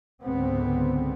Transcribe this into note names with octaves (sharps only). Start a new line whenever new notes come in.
C#2 G#2 D3 B3 C4